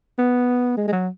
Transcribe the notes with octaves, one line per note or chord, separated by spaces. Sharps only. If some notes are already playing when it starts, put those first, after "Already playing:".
B3
G#3
G#3
F#3